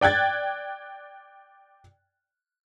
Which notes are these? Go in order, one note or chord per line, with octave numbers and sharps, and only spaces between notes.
D5 G5 F#6 G#6 A6